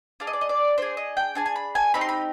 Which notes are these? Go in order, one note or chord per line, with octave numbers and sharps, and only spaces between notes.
D4 G#4 F5
D#5
D5
D#5
D5
D4 G#4 C5
D#5
G5
D4 G#4 G#5
G#5
B5
G#5
C4 D#4 G4 B5
C6
B5